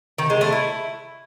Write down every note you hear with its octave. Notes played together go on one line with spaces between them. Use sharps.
D#3
G#3
A3
E4